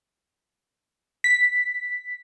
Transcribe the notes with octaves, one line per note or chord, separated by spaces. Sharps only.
B6